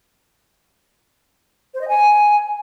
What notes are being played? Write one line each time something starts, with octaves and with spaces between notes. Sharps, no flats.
C5
D#5
G#5